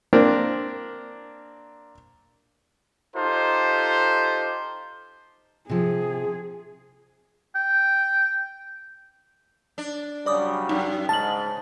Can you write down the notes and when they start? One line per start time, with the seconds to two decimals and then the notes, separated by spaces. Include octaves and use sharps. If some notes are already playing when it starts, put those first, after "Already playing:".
0.13 A#3 C4 D4 A#4
3.16 D#4 F4 G4 A4 C5
5.69 C3 F3 G#4
7.55 G5
9.78 D4
10.26 C#3 F#3 G3 D5 D6 D#6
10.69 F#2 D#4
11.09 G#2 C#3 A5 A6 F#7